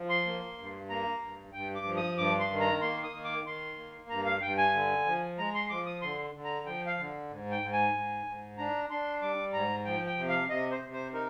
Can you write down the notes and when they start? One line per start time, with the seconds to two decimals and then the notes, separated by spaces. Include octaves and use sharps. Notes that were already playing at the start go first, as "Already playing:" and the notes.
Already playing: F3
0.09 C6
0.26 A#3
0.58 G2
0.90 A#3 A#5
1.21 G2
1.53 G2 G5
1.76 D6
1.85 F3
1.97 D#6
2.17 G2 D6
2.40 C6
2.50 D#3
2.60 A#5
2.81 A#3 C6
3.04 D#6
3.13 D#3
3.25 D6
3.45 D#3 C6
3.78 A#3
4.09 G2 A#5
4.26 F5
4.42 G2 G5
4.58 G#5
4.74 D3
5.05 F3
5.38 G#3 A#5
5.54 C6
5.70 F3 D6
5.86 D#6
6.02 D3 C6
6.34 D3
6.45 A#5
6.66 F3 G5
6.86 F5
6.98 D3
7.30 G#2
7.52 G5
7.62 G#2
7.73 G#5
7.93 G#2
8.26 G#2
8.58 D4 A#5
8.90 D4 C6
9.22 G3 D6
9.53 G#2 A#5
9.85 F3 G5
10.06 G5
10.17 C3
10.29 F5
10.50 C3 D#5
10.71 C5
10.82 C3
10.93 C5
11.14 D#4 A#4